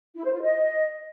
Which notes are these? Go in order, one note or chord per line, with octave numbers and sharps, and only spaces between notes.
E4
C5
F4
D#5